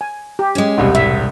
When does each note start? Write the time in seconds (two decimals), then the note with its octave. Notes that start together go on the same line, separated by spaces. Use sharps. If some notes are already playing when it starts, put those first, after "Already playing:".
0.01 G#5
0.39 G4
0.55 G#3 C#4
0.78 E1 C2 C3
0.95 A2 E5